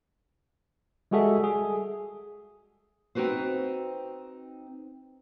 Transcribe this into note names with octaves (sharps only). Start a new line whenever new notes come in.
G3 G#3 F#4 G#4 A4 E5
G#4
C4 D#4 F#4 B4 C5